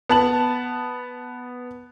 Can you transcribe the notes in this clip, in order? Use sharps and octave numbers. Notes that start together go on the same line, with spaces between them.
B3 A5 F#7